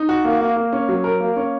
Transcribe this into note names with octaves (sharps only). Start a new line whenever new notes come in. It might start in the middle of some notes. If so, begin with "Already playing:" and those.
Already playing: D#4
F#4
A#3
A#3
A#3
C#4
F#3
A#4
A#3
C#4